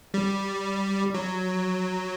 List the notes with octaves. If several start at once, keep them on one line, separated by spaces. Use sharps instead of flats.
G3
F#3